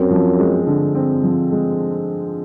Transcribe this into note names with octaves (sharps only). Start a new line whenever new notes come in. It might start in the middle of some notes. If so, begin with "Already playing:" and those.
Already playing: F#2 C4
F3
G#3
D3
C4
F3
G#3